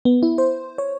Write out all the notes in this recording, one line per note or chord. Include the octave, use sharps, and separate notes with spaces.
B3
E4
C5
C#5